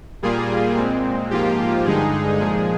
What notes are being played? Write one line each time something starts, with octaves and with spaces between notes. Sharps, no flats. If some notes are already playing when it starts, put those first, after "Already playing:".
A#2 G3 A#3 F4 G#4
A#2 G#3 C4
G#2 F3 A#3 F4 G4
G2 D3 G#3 D#4 G#4
A#2 F3 G#3 G#4